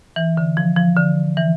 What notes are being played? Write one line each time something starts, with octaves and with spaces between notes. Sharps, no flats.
E3
D3
F3
F3
D3
E3